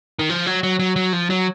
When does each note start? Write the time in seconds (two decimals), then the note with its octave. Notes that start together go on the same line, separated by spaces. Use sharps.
0.19 D#3
0.30 F3
0.46 F#3
0.63 F#3
0.80 F#3
0.96 F#3
1.13 F3
1.30 F#3